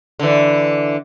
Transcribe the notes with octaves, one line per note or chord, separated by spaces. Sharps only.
D3 E3